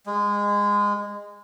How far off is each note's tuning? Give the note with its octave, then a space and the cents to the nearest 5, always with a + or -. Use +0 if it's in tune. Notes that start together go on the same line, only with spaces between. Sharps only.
G#3 -20